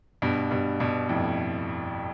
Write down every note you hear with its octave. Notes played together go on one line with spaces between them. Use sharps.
G2 B2
G2 B2
G2 B2
F2 A2